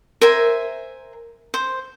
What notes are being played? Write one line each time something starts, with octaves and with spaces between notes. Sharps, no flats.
A#4 C5 E5 G#5
C5